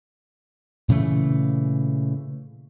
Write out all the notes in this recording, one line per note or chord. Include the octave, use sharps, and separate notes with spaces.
A#2 C#3 E3 A3